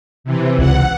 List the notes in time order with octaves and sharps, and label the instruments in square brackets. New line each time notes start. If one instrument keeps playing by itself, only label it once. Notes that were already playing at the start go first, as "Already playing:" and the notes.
[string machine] C3 E3
[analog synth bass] C#2 [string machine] F#5